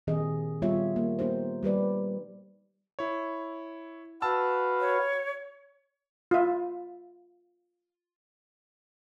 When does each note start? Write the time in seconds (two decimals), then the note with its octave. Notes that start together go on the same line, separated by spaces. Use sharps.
0.07 A#2 D#3 C4 G4 G#4 D#5
0.62 G3 B3 F4 G4 C#5 E5
0.96 A#3
1.19 B3 D#4 G4 C5
1.63 G3 G4 B4 D5
2.99 E4 C#5
4.22 F#4 B4 F5 A5 E6
4.80 C#5
6.31 F4 E5